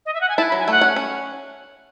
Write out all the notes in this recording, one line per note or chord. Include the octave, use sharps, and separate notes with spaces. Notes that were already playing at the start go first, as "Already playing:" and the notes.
D#5
E5
F#5
G#5
E4 A5
B5
F#3
G#5
A3 F#5
C#4
C#4